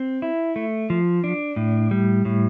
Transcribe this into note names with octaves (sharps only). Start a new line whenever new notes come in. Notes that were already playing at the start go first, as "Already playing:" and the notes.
Already playing: C4
E4
A3
F3
D4
A2
G3
A2